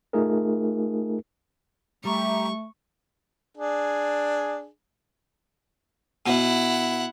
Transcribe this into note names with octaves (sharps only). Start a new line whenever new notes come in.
A3 D#4 F4 G#4 A#4
G3 A3 G4 E5 A#5 C#6
D4 G#4
B2 E4 F#5